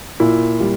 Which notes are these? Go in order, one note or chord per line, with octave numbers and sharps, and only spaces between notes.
A#2 E4
G3